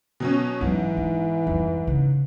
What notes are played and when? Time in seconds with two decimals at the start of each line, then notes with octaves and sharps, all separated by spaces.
0.20 B2 F#3 C#4
0.61 G#2 E3 F#3 C#4
0.97 B3
1.47 F2 G3
1.87 C#3